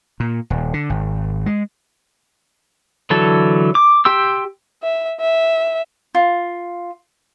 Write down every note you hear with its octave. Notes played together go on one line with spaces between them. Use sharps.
A#2
D#1
D3
G#1
G#3
D3 E3 F#3 A4
D6
G4 G5 C6 E6
E5
E5
F4